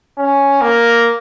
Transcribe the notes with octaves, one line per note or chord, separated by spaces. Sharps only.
C#4
A#3